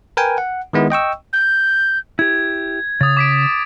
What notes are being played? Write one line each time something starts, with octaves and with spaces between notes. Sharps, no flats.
A#4 B4 G5 G#5
F#5
D#3 G#3 B3 E4
D#5 G5 C#6 E6
G6
E4 G4 G#6
C#3 D#6 A6
D6 B6 D7